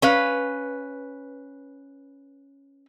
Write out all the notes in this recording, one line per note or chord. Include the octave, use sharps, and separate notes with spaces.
C#4 B4 F5